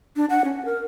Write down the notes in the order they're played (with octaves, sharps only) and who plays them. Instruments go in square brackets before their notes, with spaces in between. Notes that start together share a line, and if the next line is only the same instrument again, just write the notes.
[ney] D4
F#5
C#4
A#4